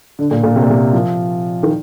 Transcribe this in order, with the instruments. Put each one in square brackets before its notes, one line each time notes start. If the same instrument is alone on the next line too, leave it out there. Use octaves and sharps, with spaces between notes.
[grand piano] D3
A#2
A#2
C3
A#2
C3
F3
D#3